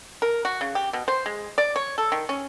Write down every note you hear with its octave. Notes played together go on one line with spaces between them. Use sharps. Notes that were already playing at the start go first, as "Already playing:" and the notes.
A#4
F#4
C#3
G4
B2
C5
G#3
D5
C#5
A4
D#3
C#4